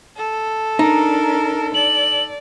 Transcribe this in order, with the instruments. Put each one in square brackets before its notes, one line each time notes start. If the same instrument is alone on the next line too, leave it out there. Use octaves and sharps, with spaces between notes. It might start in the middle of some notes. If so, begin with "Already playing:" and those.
[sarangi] A4
[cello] D4 A#4 [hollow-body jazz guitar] D#4
[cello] D5 [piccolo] F#7